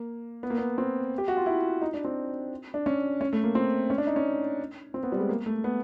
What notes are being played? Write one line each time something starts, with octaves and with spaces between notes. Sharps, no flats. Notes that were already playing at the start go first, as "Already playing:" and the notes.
Already playing: A#3
B3
A#3
B3
C4
G4
F#4
F4
E4
D#4
D4
C4
D4
C#4
C#4
A3
A#3
C4
C#4
D4
D#4
C#4
C4
B3
G3
G#3
A#3
A3
B3